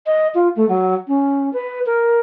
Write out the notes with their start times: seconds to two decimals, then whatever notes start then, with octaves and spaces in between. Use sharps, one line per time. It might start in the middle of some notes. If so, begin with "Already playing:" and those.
0.06 D#5
0.35 F4
0.56 A3
0.69 F#3
1.08 C#4
1.53 B4
1.86 A#4